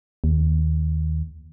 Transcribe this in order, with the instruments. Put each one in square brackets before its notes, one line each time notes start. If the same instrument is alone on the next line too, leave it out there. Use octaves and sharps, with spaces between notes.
[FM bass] D#2